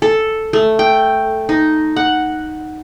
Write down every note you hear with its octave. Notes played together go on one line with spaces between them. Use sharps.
A4
A3
G5
D#4
F#5